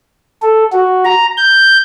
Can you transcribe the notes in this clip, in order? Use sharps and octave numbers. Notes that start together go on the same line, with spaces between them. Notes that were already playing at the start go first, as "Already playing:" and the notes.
A4
F#4
A#5
G6